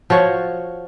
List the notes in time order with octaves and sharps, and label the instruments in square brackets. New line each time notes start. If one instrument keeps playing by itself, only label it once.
[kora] F3 F#4 C#5